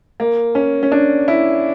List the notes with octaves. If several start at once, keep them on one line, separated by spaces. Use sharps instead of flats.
A#3
C#4
C#4
D4
E4